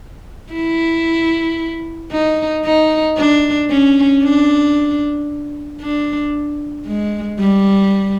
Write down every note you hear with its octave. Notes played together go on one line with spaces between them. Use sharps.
E4
D#4
D#4
D4
C#4
D4
D4
G#3
G3